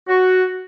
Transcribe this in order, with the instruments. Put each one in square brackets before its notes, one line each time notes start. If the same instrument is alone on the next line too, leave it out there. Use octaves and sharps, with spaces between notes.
[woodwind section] F#4